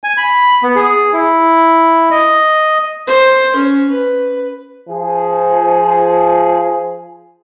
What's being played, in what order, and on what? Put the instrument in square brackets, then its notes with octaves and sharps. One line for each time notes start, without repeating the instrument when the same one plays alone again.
[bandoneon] G#5
B5
B3
G#4
E4
D#5
[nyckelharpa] C5
C#4
B4
[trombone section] F3 G#4